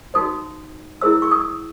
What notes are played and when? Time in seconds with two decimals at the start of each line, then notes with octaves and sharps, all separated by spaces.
0.14 D#4 F#4 C5 D#6
1.01 E4 G#4 C5 E6
1.22 C#6
1.31 D#6